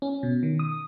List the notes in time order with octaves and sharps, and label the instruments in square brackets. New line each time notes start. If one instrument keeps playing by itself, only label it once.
[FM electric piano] C#4
B2
D#3
D#6